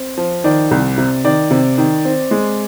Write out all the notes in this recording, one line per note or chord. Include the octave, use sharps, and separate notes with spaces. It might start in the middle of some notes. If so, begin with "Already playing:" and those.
Already playing: C4
F3
D#3 D5
C2
C3
D#3 D5
C3
D#3
C4
G#3